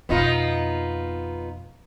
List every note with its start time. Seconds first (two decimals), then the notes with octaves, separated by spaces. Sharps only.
0.09 F2 B2 B3 D#4 F4